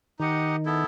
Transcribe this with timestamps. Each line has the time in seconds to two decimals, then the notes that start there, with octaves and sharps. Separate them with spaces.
0.19 D#3 D#4 G4 D#5 F#5
0.65 B3 E4 A4